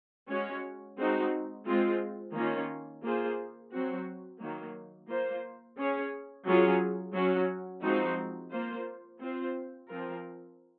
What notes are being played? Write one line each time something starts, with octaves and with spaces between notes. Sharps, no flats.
G#3 C#4 F#4 C#5
G#3 C4 D#4 F#4
G#3 C4 F4
D#3 A#3 C#4 F4
A#3 F4 G#4 C5
F#3 C4 F#4
D#3 F#3 A#3
A#3 F4 C5
C#4 G#4 C#5
F#3 C#4 F4 G#4 C#5
F#3 C#4 F#4
F3 G#3 C4 D#4 F#4
A#3 F4 C5
C4 F4 C5
F3 C4 F4 A#4